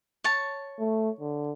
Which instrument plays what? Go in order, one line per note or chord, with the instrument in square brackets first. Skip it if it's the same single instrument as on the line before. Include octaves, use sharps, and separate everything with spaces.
[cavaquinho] C#5 A5
[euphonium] A3
D3